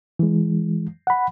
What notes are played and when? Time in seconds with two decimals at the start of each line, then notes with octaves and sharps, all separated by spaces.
0.19 E3 G#3
1.07 F#5 B5